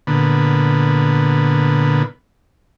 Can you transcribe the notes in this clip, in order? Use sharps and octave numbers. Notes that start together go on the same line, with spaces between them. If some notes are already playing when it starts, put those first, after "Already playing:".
A#2 D3 B3